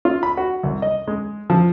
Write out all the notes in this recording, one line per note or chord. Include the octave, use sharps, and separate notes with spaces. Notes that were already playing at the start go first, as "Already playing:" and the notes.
F4
B5
F#4
C2
D#5
G#3
F3